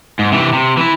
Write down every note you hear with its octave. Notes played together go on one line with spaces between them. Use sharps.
G#2
C3 E3
C3
E3 E4